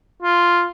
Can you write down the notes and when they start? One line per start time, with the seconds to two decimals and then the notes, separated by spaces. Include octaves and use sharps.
0.22 F4